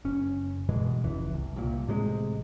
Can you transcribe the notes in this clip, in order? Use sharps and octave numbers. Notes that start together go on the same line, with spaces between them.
F#1 C#4
G2 B2 E3 G#3
F1 C#2 E3
C2
C2 A#2
A1 C3 D#3 G#3